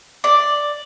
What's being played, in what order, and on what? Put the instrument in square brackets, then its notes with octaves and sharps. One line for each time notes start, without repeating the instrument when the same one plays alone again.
[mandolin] D5